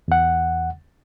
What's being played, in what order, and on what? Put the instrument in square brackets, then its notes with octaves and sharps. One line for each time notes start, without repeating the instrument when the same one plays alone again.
[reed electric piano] E2 F#5